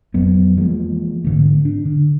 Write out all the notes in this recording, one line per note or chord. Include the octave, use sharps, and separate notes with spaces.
F2 F#3 B3
E3 F3 G#3 A#3
G#2 D3 A3
D4
D3